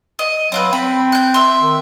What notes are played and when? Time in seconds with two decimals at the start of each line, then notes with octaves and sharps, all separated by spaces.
0.19 D#5
0.52 F#3 C4 F4 B4
0.73 C4 B5
1.12 F#6 G6
1.34 E5 C6
1.60 D#3